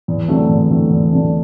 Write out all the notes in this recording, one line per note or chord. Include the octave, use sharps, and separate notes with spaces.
E2
D3 F#3 A3 C4
E2
D3 F#3 A3 C4
E2
D3 F#3 A3 C4